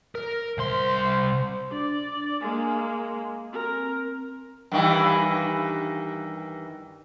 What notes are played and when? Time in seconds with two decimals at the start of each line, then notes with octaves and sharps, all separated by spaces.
0.15 A#4
0.58 C2 C5 C6
1.72 D4 D5
2.41 G#3 A#3 G#5
3.53 C4 A#4
4.72 G2 D#3 E3